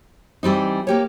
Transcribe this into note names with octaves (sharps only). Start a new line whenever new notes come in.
E3 G3 C4 D#4
A#3 G4 C#5